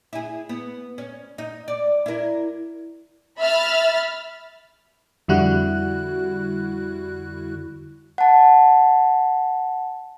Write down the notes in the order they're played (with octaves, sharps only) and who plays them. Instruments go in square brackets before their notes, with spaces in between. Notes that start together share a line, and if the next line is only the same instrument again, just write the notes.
[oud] E4 G#4
B3
C#4
D#4
D5
E4 A#4
[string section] E5 B5 F6 A6
[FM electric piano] F2 D3 G3 E4 F#4 F#6
[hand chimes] F#5 A5